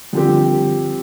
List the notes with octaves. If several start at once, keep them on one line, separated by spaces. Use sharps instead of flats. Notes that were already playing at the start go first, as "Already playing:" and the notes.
D3 F3 G3 C4 G4